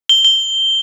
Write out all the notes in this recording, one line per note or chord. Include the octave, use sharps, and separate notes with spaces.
G7
G7